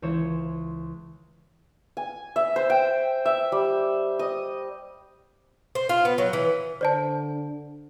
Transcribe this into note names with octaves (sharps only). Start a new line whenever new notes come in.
C#2 E3 C5 C#5 E7
G#5
E5
C5
G5
E5
G3
D#5
C5
F4
B3
F#3
E3
D3 C5 D5 A5